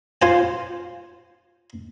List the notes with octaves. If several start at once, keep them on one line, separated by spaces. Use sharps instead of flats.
F4 C5 G#5